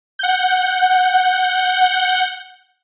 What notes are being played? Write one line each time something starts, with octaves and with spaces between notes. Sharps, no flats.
F#5 G6